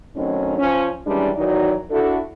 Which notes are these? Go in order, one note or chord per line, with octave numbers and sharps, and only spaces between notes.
A2 D#3 F#3 C4 C#4 D#4
F3 C#4
D#3 E3 G3 G#3 C#4 D4
D#3 E3 F#3 D#4 F#4 D5
D4 E4 F#4 A4